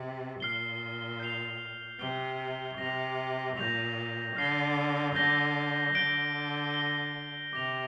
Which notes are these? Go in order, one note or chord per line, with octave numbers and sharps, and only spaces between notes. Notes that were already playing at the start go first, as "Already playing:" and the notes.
Already playing: C3
A#2 F6 C7 G7
G6 C7 F7
C3 F6 C7 G7
C3 A#6 F7
A#2 G6 A#6 F7
D3 F6 C7 G7
D3 G6 A#6 G7
D3 G6 D7 G7
A#6 G7
C3 D6 A#6 F7